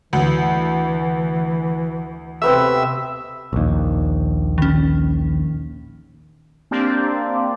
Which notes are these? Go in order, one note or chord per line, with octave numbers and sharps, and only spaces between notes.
D2 E3
C3 A3 B3 C4 E5
A#1 D#2
D#3 C#4
A#3 C4 D4 G4 D5